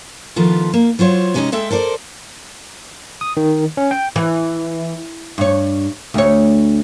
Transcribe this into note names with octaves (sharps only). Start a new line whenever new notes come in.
D#3 F3 A3 B3 F4
A#3
F#3 F4 C5 C#5
C3 G#3 A3 C#4 D#4 D#5
G#3 A4 E5 G5
A4 A#4 C5 D5
D#6
D#3
C#4
G5
E3
G2 C#5
D2 C#5